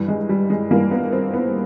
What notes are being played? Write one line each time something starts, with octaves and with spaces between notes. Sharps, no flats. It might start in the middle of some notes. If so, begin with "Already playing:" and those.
Already playing: G2 E3 G3
G#3
G3
G#3
G2 E3 G3 A#3
B3
C4
B3